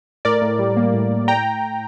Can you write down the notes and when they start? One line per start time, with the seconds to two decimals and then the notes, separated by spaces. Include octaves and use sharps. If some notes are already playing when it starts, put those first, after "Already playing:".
0.25 A2 A#4 D5
0.42 A2
0.59 G3
0.77 A#3
0.94 A2
1.11 A2
1.28 G5 A#5